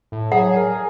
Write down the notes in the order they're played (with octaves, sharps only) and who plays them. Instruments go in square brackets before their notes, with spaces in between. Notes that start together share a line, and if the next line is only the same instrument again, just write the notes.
[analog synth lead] A2
[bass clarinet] F#3 [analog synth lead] G#4 [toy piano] F#5
[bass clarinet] A#4